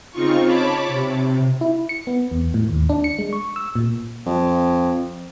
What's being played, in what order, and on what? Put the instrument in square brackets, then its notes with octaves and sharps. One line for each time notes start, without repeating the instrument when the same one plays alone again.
[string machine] C#3 C4 D#4 F4 C#6
C#5 A5 B5 D6
C3
[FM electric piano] E4
C#7
B3
E2
A2
D#2
D4
C#7
G#3
C#6
E6
A#2
[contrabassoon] F2